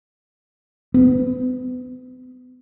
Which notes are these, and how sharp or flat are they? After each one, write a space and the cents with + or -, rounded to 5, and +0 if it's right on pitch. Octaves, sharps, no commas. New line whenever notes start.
B3 +40